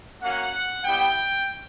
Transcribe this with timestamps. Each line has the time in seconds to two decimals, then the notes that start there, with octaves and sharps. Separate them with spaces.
0.22 A#3 C#4 F#4 F#5
0.85 G3 B3 E4 G4 G5